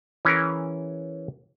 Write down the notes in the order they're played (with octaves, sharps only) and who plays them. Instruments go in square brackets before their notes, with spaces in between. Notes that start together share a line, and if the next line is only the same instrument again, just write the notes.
[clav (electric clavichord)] E3 C#4 G#4 A#4